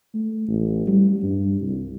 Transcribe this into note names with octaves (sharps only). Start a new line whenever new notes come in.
A3
A1
G3
G2
C2